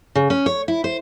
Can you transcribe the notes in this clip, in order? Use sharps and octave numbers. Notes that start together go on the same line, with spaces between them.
C#3
C#4
C#5
E4
C5